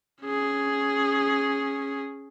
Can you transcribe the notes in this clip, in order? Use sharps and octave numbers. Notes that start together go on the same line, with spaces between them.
C#4 G#4